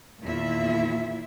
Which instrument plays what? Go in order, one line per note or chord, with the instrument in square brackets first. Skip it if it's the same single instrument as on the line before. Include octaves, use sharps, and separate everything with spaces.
[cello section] E2 A#2 D#3 E4 F4 E5